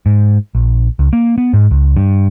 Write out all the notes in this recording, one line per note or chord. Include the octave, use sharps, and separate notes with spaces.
G#2
A#1
C#2
A#3
B3
G#2
C#2
G2